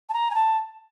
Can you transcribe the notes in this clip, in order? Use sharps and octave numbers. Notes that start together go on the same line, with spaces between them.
A5
A#5
G#5
A5